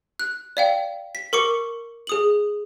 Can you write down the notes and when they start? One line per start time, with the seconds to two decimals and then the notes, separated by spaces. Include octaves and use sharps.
0.20 F#6
0.57 D5 F5 G5
1.15 B6
1.33 A#4 C#6 D6 C#7
2.07 G#4 D#6 F#7